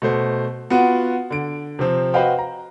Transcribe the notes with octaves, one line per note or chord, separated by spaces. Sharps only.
B2 A3 C5
B3 F4 F#4
D3 D7
C3 F3 C4
F#4 B4 C5 D#5 F5 G5
A#5